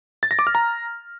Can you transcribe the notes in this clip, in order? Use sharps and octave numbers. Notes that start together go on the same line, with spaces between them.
A6
A#6
D6
F6
A#5